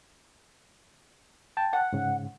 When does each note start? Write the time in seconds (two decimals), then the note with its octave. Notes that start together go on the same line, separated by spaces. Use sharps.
1.57 G5 A5
1.73 F#5
1.93 G#2 C#3